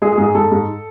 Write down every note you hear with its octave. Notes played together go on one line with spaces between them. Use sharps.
G#3 G#4
G#4
G#2
G#4
G#2 A4
G#2